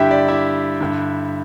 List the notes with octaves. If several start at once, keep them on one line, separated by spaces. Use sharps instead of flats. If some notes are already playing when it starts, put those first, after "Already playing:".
Already playing: G2 D3 E4 G4 E5 G5
D5
E4 E5
G2 D3